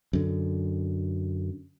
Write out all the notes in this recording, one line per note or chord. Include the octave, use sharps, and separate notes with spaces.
F#2 D3